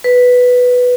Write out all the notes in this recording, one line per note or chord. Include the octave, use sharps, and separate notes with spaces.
B4